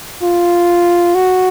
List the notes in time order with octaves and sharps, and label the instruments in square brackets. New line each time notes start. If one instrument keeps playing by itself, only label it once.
[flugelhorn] F4
F#4